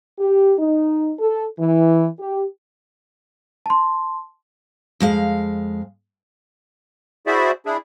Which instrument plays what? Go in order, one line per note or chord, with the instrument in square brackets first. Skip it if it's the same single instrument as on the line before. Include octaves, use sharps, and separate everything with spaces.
[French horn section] G4
D#4
A4
E3
G4
[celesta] A5 C6
[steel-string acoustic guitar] F2 G#3 F5
[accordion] E4 F#4 G#4 C5 D5 E5
D4 E4 G#4